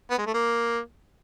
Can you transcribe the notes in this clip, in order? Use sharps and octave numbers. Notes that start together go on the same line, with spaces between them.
B3
G#3
A3
A#3